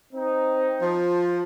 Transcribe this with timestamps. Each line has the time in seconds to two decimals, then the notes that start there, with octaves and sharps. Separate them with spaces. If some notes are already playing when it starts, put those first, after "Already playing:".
0.14 C4 D#4
0.82 F3